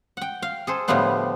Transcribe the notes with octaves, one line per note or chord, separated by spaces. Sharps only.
F#5 G5
F5
G#4 A4 C5
A2 D3 F3 G3 B3 F4